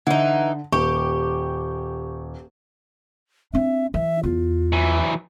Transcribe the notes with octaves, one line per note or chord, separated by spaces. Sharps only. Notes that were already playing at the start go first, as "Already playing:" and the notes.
D3 E3 D#4 F#5
D#1 G4 C#6
C4 D4 E5
E3 E5
E2 F4
E3 F#3